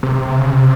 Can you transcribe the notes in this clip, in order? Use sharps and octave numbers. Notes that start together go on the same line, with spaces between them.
C3
C3
C3
C#3
C3